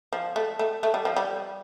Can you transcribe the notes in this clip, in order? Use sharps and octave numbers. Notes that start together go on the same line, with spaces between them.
F3
A3
A3
A3
G3
F3
G3